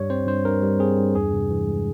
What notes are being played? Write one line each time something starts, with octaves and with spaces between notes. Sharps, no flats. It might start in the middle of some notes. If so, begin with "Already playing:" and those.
Already playing: G2 G3 C#5
C4 C5
G2 C5
G2 A#4
G3
C4 G#4
G2
E2 G#4
C3
E3
G#3